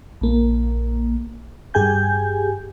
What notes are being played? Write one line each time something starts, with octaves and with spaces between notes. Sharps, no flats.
A#1 A#3
G2 G4 G#4 G#5 G6